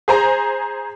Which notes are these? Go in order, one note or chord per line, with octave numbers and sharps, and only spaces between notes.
G#4 C5 A#5